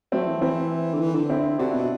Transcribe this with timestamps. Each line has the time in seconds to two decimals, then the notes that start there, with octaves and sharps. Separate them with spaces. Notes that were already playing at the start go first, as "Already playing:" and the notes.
0.12 F#3 A3 C4
0.26 E3
0.41 E3 C4 E4
0.94 D3
1.01 E3
1.15 D3
1.29 C4 E4
1.59 C3 D4 F#4
1.71 B2 E4
1.79 F#4